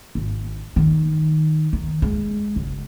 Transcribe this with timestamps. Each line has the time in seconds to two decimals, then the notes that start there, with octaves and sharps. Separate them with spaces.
0.15 G#1
0.76 D#3
1.73 D#3
2.02 G#3
2.56 F#1